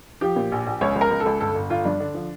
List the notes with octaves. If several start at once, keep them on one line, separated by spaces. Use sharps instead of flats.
F3 G4
A#2
A#1
A#1
C#2 C#5
C#2
A#4
C#2
A4
C#2
G1 A4
G1
G1 F4
G2 D4
D3 D4
F3